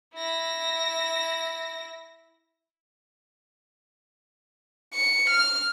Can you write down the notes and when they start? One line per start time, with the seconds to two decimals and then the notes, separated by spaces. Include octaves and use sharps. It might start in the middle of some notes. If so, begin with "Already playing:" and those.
0.15 E4 A#6
4.94 C#7
5.30 F6